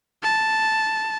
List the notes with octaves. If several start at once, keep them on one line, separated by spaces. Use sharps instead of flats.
A5